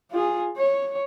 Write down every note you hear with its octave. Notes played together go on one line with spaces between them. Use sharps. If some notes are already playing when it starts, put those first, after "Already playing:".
F4 G#4
C#5